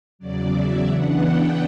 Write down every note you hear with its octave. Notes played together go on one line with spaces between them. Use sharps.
E2 C#3 F#3 D5
E5
C#3 E3 B3 D4 F#5
G5